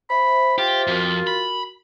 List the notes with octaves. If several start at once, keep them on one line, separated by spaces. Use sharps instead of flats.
C5 E5 B5
F4 G4
F2 F#4 A#4
B5